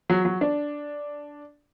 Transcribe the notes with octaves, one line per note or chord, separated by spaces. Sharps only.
F#3
F#3
D4